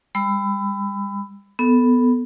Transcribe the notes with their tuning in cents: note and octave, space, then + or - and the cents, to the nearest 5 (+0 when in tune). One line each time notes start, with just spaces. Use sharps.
G3 +35 B5 +25 E6 +15
B3 +0 A4 +0